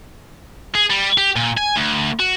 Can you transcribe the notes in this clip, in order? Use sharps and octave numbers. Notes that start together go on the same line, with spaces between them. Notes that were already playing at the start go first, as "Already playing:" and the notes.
G#4
G3
G4
A#2
G#5
D2
F#4